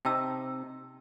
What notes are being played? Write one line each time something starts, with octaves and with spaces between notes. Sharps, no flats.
C3 D#4 G5 A5 E6